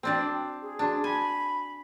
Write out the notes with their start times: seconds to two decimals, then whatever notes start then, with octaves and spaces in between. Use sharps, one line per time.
0.03 C4 D4 F#4 D5 G5
0.62 G#4
0.79 D4 F#4 A5
1.04 G#5 B5